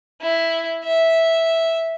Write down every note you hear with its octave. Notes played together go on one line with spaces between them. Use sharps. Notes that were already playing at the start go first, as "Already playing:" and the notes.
E4
E5